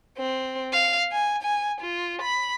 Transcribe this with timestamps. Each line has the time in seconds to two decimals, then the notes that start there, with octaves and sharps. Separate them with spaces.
0.17 C4
0.73 F5
1.12 G#5
1.42 G#5
1.81 F4
2.22 B5